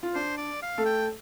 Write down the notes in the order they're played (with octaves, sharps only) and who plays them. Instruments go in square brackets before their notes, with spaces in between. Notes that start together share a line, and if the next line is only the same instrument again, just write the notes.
[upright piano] F4
[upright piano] D4 [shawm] C5
[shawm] D5
F5
[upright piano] A3 A4
[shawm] G5